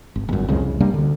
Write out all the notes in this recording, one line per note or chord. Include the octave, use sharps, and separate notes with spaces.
G#1
G1 F#2
C2 F2 C#3 G#3
C3 G3 A#3 D4
D2 D3